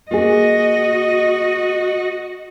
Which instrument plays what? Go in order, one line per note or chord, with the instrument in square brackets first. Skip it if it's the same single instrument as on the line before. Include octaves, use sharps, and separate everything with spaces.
[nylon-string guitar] A#3 G#4 [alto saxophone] F#4 [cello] D#5